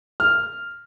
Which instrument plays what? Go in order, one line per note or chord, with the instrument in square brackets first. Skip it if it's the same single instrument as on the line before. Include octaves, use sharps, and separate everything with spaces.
[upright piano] F6